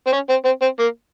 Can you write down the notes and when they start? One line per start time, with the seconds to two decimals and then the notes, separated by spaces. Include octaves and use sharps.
0.07 C4
0.12 C#4
0.29 C4
0.45 C4
0.61 C4
0.79 A#3